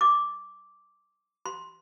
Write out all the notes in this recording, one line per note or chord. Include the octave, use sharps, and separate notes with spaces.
D6
C6